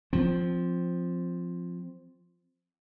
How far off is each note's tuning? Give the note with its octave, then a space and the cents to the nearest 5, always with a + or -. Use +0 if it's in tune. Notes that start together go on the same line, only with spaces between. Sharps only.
F3 +0 C4 +0